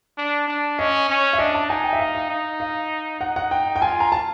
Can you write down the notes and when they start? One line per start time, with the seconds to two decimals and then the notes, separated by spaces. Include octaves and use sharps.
0.18 D4
0.48 D4
0.79 C#4 D#5
1.09 C#4
1.33 E5
1.39 D4 D#5
1.54 A5
1.69 D#4 G#5
1.84 G5
1.93 E5
2.00 F5
2.15 F5
2.30 D#4
2.60 F5
3.21 D#4 F#5
3.36 F#5
3.51 G5
3.76 G5
3.81 F4 G#5
4.00 A#5
4.12 A5